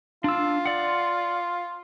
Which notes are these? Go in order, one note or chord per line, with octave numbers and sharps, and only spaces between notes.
D4 F4 E6
D5 F#5